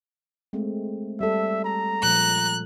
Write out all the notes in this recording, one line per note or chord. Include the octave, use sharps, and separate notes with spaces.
G#3 A3 C4
G3 A4 E5
A#5
A#2 F3 F#6